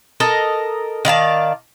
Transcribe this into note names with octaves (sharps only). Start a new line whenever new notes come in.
A4 A#4 D#5
D#3 D5 F5 A5